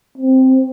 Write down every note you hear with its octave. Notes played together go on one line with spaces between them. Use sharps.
C4